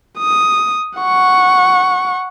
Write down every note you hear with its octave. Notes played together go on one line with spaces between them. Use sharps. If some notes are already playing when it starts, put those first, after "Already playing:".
D#6
F#5 C#6